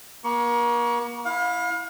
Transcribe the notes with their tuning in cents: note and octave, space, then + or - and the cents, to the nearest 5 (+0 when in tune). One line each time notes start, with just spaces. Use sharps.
A#3 +35 C#6 +25
E4 -5 F5 +35